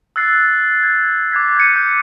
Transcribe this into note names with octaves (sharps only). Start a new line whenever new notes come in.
E6 F#6 A6 C7
G#6
D6 F#6 G#6 B6
G6 G#6 C#7 D#7
G6